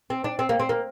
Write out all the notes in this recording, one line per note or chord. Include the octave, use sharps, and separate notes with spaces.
C4
D4
C4
A#3
C4
A#3